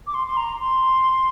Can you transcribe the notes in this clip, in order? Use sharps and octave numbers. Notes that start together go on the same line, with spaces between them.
D6
C6
C6
A#5
C6